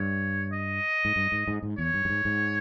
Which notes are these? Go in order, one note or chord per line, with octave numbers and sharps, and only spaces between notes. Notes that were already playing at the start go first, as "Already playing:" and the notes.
Already playing: G2 C#5
D#5
G#2
G2
G#2
G#2
G#2
E2 C#5
G2
G2
G#2
G#2